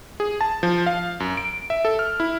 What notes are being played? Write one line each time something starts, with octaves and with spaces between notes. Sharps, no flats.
G#4
A5
F3
F5
F#2
D7
E5
A4
F6
E4